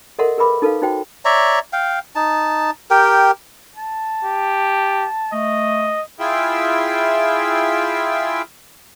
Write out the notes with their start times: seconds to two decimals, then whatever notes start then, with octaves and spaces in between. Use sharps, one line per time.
0.19 A4 A#4 D#5 E5 F#5 C6
0.38 G#4 A#4 B4 E5 B5 D6
0.62 D#4 A4 B4 F5
0.82 D#4 F#4 C5 G5
1.25 C#5 D5 E5 A#5
1.73 F5 G5
2.15 D#4 A5
2.91 G4 A#4 G5
3.75 A5
4.25 G4
5.32 A3 D#5
6.20 E4 F4 G#4 E5 G5